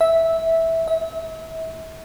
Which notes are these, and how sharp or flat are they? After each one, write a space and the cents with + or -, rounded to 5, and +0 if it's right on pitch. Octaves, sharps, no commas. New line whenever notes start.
E5 -10
E5 -35